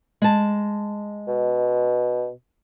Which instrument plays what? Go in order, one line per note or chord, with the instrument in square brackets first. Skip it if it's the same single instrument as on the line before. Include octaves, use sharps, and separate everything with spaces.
[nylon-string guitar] G#3 A5
[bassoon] B2